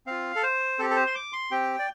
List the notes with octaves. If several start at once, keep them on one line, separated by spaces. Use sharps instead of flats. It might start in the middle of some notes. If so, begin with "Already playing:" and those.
C4 F4 F5
A4
C5
C4 G4 A4
A4
C5
C6
D6
C6
C4 G4 G5
D5